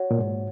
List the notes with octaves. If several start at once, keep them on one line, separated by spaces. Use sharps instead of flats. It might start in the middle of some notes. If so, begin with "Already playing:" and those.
Already playing: F#4 C#5 F#5
A#2
G#2